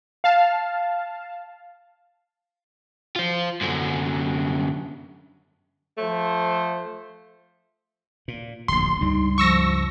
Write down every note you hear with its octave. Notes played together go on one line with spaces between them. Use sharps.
F5 A5
F4 C5
F#2 D3
F3 A3 C5
A#2
D1 A#1 C6
C#2 G2 G3 D#4
F3 C#6 E6 A#6